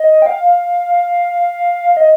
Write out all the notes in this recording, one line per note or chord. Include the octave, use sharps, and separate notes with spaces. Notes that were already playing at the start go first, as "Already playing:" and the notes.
Already playing: D#5
G5
F5
D#5